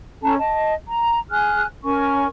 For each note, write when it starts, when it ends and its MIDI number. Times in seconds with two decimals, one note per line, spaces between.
0.22 0.35 61
0.22 0.35 69
0.22 0.35 81
0.22 0.35 82
0.38 0.74 75
0.38 0.74 81
0.87 1.20 82
1.31 1.65 68
1.31 1.65 80
1.31 1.65 89
1.31 1.65 90
1.84 2.27 61
1.84 2.27 70
1.84 2.27 80
1.84 2.27 85